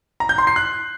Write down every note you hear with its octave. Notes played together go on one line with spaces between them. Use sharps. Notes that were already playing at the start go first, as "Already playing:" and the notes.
A#5
G6
C6
C7
F#6